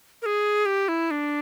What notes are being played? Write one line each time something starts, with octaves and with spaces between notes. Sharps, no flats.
A#4
G#4
G4
E4
D4